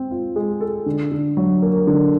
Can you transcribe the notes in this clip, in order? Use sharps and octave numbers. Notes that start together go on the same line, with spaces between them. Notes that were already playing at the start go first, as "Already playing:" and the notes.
Already playing: C4
F4
G#3
A4
D3
D3
F#3
A#3
D3